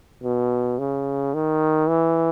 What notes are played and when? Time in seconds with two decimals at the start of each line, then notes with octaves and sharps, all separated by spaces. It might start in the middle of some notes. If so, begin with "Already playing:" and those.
0.23 B2
0.79 C#3
1.34 D#3
1.89 E3